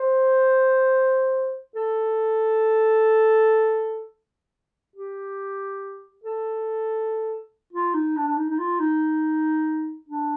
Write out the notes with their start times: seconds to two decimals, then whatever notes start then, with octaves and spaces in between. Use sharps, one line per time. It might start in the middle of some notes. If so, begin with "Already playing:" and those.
Already playing: C5
1.75 A4
4.96 G4
6.23 A4
7.73 F4
7.94 D#4
8.16 D4
8.27 D4
8.37 D#4
8.50 D#4
8.59 F4
8.79 D#4
10.08 D4